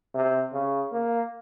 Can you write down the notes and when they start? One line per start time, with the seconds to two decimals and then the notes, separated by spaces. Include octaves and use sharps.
0.15 C3
0.53 C#3
0.92 A#3